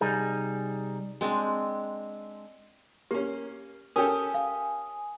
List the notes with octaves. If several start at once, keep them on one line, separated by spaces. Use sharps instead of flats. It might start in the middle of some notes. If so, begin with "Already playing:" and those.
C2 G3 D#4 G#4
G#3 C4 D4
A#3 C#4 G4
C#4 G4 A4 A#4 G#5 D#6
F5